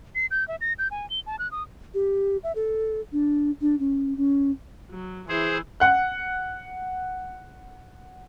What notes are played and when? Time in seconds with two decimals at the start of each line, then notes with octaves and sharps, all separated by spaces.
0.15 C7
0.31 G6
0.48 E5
0.61 A#6
0.79 G6
0.91 G#5
1.10 G7
1.26 A5
1.39 F#6
1.52 D#6
1.94 G4
2.44 E5
2.56 A4
3.12 D4
3.61 D4
3.80 C#4
4.17 C#4
4.91 F#3
5.29 E3 E4 G#4 C5
5.80 F#5 F#6